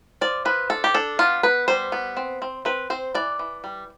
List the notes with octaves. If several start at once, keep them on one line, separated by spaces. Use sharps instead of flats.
F3 D5
F3 B4
D4 A4
G4
D4 A4
B3 F4
B3 B4
G3 C5
B3
C4
C4
C4 B4
C4 C5
E3 D5
E3
G3